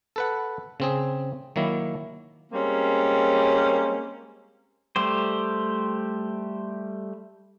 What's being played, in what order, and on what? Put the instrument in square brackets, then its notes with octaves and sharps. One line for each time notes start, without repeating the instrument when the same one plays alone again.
[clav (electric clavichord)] A4 B4 F#5
C#3 C4 G#4
D#3 F#3 A#3 E4
[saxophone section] G3 G#3 A#3 C4 C#4
[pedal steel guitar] G3 A3 G4 C5